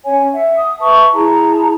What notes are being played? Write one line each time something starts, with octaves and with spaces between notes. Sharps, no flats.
C#4 C#5 G#5
E5 F#5
D#6
B4 E5 A5 C#6
E4 G#4 A5 A#5